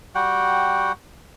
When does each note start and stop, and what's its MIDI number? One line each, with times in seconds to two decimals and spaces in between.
0.15 0.92 55
0.15 0.92 66
0.15 0.92 78
0.15 0.92 79